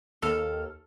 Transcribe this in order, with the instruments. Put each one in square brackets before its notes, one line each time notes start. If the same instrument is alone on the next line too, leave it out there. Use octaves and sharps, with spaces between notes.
[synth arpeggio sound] D#2 F6 [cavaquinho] A4